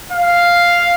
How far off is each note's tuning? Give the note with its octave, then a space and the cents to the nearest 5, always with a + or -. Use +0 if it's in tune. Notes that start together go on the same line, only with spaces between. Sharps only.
F5 +0